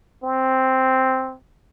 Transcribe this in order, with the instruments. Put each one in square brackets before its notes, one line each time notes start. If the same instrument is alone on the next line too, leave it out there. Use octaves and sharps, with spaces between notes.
[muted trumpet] C4